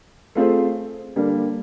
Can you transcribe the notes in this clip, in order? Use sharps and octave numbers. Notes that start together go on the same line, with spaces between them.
A3 C4 F4 G#4 C5
D3 G3 A#3 D4